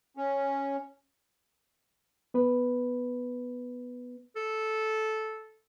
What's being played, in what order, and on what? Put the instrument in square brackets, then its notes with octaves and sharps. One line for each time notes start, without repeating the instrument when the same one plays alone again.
[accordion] C#4
[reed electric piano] B3 B4
[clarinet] A4